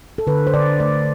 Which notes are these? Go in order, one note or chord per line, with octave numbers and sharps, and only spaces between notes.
A4
D3 B4
C5
D3 D5
A3 D5